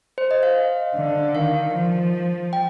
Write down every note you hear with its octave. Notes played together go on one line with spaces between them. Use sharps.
C5
D#5
F5
D3
D#3 F5
F3
G5